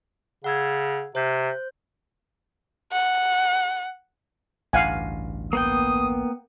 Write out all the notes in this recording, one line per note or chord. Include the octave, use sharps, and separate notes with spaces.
C#3 F#5 E6 G#6
C3 C5 G6
F#5
A1 D2 G2 F5 F#5 G#5
A#3 B3 G5 D#6